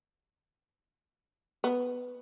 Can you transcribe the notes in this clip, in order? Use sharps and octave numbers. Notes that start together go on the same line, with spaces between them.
B3